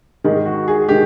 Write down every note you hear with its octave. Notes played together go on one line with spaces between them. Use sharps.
G#2 D#3 G#3
F#4
G#4
D#3 G#3 G4